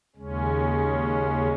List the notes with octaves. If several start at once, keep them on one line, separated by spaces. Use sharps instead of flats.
D#2 C#3 G#3 C#4